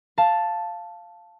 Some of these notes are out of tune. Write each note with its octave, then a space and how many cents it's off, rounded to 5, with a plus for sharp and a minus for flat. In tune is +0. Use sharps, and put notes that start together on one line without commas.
F5 -5 A5 +0